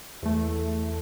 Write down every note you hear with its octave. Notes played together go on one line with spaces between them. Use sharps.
E2 A3